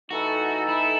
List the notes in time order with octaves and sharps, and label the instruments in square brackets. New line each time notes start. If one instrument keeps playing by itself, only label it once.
[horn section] E3 A3 D#4 A4 [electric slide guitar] F#4
[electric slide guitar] E4